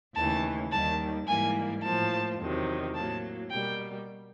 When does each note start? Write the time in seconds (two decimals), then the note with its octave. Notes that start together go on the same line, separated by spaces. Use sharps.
0.16 D#2 C#3 E3 A3 A5
0.71 D#2 D#3 G3 A#3 A5
1.27 G#2 E3 G3 A#3 G#5
1.83 A2 F3 A#3 A5
2.39 E2 C3 D#3 F#3
2.94 A2 F#3 A#3 A5
3.50 B2 G3 A#3 G5